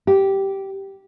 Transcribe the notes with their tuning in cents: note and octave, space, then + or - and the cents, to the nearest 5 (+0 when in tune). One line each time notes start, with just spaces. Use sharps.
G4 -10